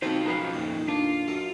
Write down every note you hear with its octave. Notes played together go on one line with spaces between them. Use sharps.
B1 D#3 C4 F4 A4 C5
G#2 F3 D#4 B4 F5
F2 A#2
D4 F4
F#2 A4 A#4